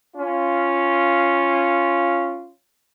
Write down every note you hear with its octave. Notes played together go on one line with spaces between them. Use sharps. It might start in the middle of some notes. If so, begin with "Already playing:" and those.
C#4 F4